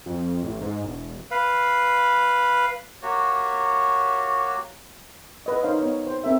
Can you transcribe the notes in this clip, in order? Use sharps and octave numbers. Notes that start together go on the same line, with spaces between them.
F2
A1
G#2
E1
B4 F5
A#3 F#4 G4 C#5
B4 D#5
D#4 A#4 C5 C#5 F5
B3 C#5 F5
C5
C4 A4 A#4 E5